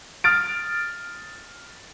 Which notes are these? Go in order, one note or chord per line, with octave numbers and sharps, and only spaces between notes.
D#6 F6 A6 D7